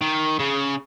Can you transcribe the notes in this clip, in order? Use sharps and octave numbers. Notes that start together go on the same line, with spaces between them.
D#3
C#3